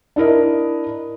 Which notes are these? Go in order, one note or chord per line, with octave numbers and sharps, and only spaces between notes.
D4 E4 A#4 D#5